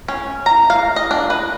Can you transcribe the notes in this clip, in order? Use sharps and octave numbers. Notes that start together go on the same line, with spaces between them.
C#4
A#5
F5
D#5
D4
B4